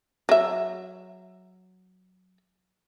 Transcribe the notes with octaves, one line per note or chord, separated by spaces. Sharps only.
F#3 E5